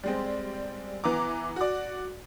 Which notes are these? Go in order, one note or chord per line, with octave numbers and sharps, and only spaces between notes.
G3 G#3 C4
E3 B3 A#5 D6
F#4 D5